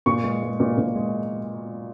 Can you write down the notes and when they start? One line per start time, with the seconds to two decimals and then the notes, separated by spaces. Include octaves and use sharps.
0.06 A#2 C#6
0.24 G#3
0.42 G#3
0.60 A#2
0.77 A#2
0.96 G#3